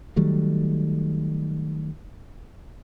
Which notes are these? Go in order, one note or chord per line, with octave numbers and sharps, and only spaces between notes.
D#3 F#3 G3 A3